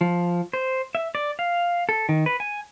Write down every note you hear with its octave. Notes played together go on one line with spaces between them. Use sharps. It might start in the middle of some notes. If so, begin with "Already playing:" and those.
F3
C5
E5
D5
F5
A4
D#3
B4
G#5